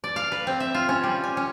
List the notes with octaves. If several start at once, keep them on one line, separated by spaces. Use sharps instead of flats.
D5
F5
B4
C4
E5
F4
C#4
G3
G#5
C#4